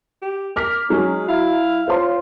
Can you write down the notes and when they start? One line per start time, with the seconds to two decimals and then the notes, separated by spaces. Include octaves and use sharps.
0.22 G4
0.56 A#4 D6 F6 B6
0.90 F#3 G#3 C#4
1.28 E4 F5
1.87 F4 C5 C#5 C6